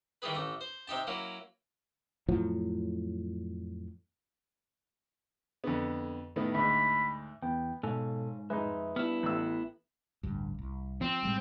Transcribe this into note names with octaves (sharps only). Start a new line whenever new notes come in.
D#3 E3 G3 G4 G#4 B4
A1 A3 A#5
C5
C3 D#4 G4 A5
F#3 A#3 C#4 E4
F2 A2 F3 F#3
F2 D3 B3
A2 D#3 B3
D2 G#2 B5
E2 B3 G5
G#2 B2 A4 C#5 F5 G#5
F2 G#3 D#4 B4 D#5 E5
G3 B3 D4 E4 F6
A1 E6
A1 D2 G2
C2
F3 C4
A2 G3 G#3